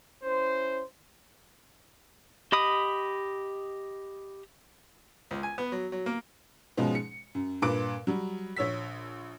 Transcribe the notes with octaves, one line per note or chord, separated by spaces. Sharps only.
C#4 E4 C5
G4 D#5 B5 D#6
C#2
G#5
B3
F#3
F#3
A#3
G#2 B2 F3 G#3 C#4 D#4
C#7
F#2
G2 A#2 B4 D6 D7
F#3 G3
A#1 C#5 E6 B6